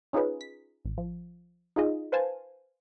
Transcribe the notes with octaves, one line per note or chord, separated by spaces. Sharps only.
C#4 D#4 F4 G#4 B4
B6
A1
F3
D#4 F4 G#4 D#5
B4 C5 F5 G#5 A5